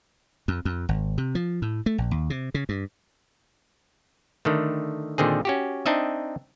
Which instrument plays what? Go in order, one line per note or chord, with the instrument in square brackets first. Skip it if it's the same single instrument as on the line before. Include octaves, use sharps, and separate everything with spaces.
[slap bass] F2
F2
G#1
C3
F3
A2
A3
A#1
D#2
C3
C#3
G2
[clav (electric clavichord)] D3 D#3 A3
A#2 D3 D#3 C4 G#4
C#4 F#4 G4
C4 D4 D#4 D#5 E5